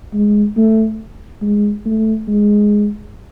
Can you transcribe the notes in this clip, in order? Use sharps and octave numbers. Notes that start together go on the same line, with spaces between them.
G#3
A3
G#3
A3
G#3